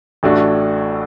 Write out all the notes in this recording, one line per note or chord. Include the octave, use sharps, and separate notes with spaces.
A1 A2 A3 D4 F#4